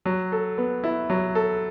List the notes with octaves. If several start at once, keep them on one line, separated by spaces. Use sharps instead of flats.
F#3
A4
B3
E4
F#3
A4